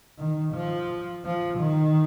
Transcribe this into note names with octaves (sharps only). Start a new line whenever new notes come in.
D#3
F3
F3
D#3